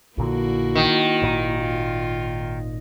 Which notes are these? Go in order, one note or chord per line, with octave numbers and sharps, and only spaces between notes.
A#1 A#2 D3 A#3 E4 F#4
D#3
G#1 A#2
F4